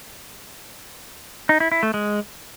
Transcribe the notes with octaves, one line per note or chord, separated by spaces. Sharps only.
D#4
E4
E4
A3
G#3